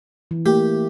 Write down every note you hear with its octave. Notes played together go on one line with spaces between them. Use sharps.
E3
A3 A#3 G4 A#4